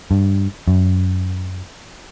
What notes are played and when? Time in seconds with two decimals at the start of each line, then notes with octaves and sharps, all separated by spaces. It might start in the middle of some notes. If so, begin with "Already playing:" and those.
0.11 G2
0.68 F#2